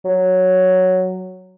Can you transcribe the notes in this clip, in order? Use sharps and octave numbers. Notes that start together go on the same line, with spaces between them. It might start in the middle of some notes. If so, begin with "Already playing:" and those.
F#3